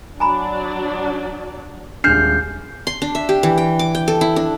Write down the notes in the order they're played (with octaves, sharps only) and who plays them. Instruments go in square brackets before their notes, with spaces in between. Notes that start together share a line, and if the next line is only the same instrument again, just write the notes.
[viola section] F#3 D4 D5 [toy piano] G#5 A#5 B5
[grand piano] D#1 G#3 F6 [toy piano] D4 [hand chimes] G6 C7
[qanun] C6
D4
E5
G4
E3
G5
D6
G5
A4
E4
D4